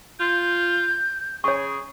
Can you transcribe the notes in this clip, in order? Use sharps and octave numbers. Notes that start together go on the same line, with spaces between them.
F4 G6
C#3 G#4 C#5 C#6